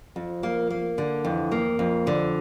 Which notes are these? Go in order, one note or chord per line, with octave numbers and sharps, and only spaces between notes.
F2 F3
A#3
A#3
D3
F2 E3
A#3
F2 F3
D3